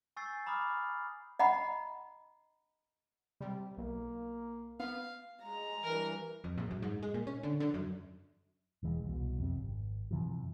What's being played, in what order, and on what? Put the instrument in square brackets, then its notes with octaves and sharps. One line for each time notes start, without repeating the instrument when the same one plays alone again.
[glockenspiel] G#5 C#6 E6 G6 A6 C7
A#5 B5 D6 D#6 F6
[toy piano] D#5 F#5 A#5 B5
[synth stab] C3 G3
[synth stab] B1 [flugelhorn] A#3
[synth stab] B3 [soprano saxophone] F5
[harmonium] G#3 [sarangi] A#5
[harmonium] G2 E3 [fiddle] A#4
[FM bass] F2
A#1
F#2
G#2
G#3
A#2
C#4
D3
D3
F#2
[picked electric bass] E1 E3 G#3
C2 B2
F2 C3
G#1
F#2 C3 E3 F3